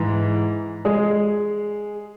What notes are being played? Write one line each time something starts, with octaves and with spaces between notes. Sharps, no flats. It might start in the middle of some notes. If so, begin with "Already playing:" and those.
Already playing: G#2 E3
G#3 G#4